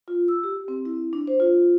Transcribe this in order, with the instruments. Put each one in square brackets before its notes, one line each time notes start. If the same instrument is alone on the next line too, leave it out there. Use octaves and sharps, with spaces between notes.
[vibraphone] F4
E6
G4
C4
E4
D4
C5
F4